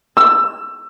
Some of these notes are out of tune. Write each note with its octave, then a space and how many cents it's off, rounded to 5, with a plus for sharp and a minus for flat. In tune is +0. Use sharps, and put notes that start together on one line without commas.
E6 +20